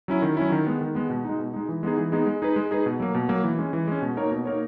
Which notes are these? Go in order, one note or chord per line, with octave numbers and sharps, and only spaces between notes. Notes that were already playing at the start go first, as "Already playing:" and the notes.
F#3 C#4 E4
D#3
F#3 C#4 E4
D#3
G#3 B3
D#3
G#3 B3
B2
G#3 D#4
B2
G#3 D#4
E3
G#3 B3 D#4 G#4
E3
G#3 B3 D#4 G#4
G#3
D#4 G#4 B4
G#3
D#4 G#4 B4
B2
F#3 A#3
B2
F#3 A#3
E3
G#3 C#4
E3
G#3 C#4
B2
A#3 D#4 A#4 C#5
B2
A#3 D#4 A#4 C#5